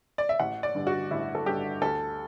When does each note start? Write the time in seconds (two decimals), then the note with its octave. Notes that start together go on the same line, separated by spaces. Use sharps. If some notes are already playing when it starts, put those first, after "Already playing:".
0.18 D5
0.29 E5
0.40 A1 F#5
0.63 D5
0.75 G2 D3
0.87 F#4
1.11 A1 E4
1.35 A4
1.46 G2 D3 G4
1.82 D2 A4